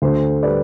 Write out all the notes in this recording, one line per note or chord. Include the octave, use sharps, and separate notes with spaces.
D2 A4 C5
G3 B4 D5